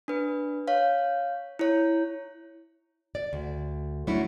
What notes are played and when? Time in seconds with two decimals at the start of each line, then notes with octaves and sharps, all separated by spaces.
0.08 D4 B4
0.68 C#5 F5
1.59 E4 C#5
3.15 D5
3.33 D2
4.07 F#3 A3 C#4 D4 E4